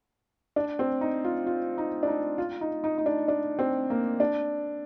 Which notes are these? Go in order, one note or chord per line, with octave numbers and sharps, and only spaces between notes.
D4
C4
D#4
F4
F4
D#4
D4
D#4
F4
D#4
D#4
D#4
D4
D4
C4
A#3
D4